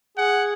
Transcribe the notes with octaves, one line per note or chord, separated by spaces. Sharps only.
G#4 F#5